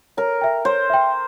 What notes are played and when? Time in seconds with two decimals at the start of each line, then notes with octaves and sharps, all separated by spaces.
0.17 A#4 C#5
0.41 E5 G5
0.65 C5 C#5
0.90 E5 G5